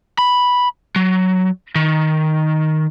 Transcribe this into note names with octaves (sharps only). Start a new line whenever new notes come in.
B5
F#3
D#3